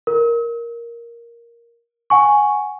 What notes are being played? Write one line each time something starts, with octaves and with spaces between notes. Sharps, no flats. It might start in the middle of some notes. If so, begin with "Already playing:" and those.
A#4
F#5 G#5 C#6